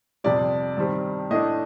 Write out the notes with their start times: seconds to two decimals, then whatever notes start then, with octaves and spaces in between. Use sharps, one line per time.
0.24 F2 C3 G3 D5
0.77 G2 D#3 G3 C4
1.31 A2 A3 D4 D#5